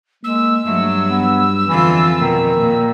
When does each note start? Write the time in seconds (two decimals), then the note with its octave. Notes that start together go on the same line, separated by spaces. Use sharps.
0.23 G#3 A#3 E6
0.66 G2 F#3 A3
1.08 B3
1.69 F2 D3 E3 F4
2.19 B2 D#3
2.58 A#2